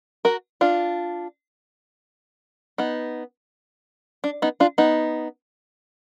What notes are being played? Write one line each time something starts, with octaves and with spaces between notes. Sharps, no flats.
F#4 A#4
D4 F4
B3 D#4
D4
B3 D#4
D4 F4
B3 D#4